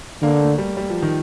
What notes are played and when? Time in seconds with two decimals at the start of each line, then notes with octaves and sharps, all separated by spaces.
0.22 D3 A#3
0.41 A3
0.58 G3
0.77 G3
0.90 F3
1.02 D#3